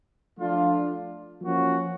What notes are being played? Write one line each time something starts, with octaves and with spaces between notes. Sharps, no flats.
F3 A3 D4 F4
F3 A#3 C#4 F#4